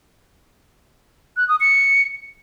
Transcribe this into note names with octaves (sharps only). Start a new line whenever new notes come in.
F#6
D#6
C#7